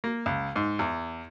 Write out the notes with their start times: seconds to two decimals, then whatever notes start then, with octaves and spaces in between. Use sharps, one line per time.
0.04 A#3
0.26 C#2
0.56 G#2
0.79 E2